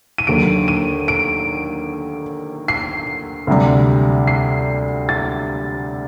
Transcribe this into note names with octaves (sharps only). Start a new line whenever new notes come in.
D#7
D#2 D3 F#3 D7
D#7
D7
C7
D2 C3 G3
C7
A6